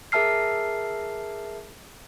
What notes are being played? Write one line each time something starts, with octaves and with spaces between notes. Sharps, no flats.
G#4 A#4 E5 A5 F6 C7